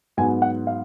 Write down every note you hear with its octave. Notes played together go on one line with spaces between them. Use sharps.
G#2 F#3 B3 G#5
F#5
F5